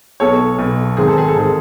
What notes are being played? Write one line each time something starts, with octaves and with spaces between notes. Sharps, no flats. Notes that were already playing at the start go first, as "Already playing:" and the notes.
B1 B2 A4 C#5
B1 B2
G#1 G#2 D#3 G#4
A4
G#4
A4
G#1 G#2 D#3 G#4